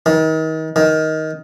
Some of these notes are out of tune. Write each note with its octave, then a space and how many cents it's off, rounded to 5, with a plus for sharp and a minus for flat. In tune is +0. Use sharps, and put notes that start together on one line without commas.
D#3 +35
D#3 +15